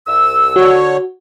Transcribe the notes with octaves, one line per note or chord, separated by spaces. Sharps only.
C2 E6
D3 F#4 C#5